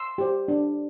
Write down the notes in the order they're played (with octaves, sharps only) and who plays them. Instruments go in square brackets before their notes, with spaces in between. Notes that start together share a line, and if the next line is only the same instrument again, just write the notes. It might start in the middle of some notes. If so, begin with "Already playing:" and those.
Already playing: [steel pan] C6 E6
G4 C5
D4